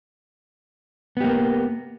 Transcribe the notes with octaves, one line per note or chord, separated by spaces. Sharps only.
A#3 B3 G4